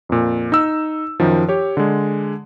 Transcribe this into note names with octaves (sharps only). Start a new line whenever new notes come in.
F2 A#2
D#4 E6
F#2 D#3 F3
G4 C#5
D3 G#3